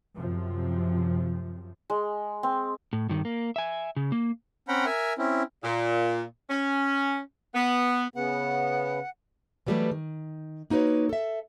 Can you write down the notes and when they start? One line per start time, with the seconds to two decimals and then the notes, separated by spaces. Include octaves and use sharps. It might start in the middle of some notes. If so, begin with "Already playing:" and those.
0.16 F#2 C3 F3
1.90 G#3
2.43 C4
2.93 A2
3.09 G2 D#3
3.25 A#3
3.56 E5 G#5
3.96 C#3
4.12 A#3
4.68 C4 C#4 F#5 G5 A#5 B5
4.86 A#4 E5 G#5
5.18 C4 C#4 E4
5.64 A#2
6.50 C#4
7.55 B3
8.15 C#3 B3 F#5
9.67 E3 F#3 G3 A3 G4 B4
9.91 D#3
10.70 A#3 D#4 F#4 B4 C#5
11.09 A4 E5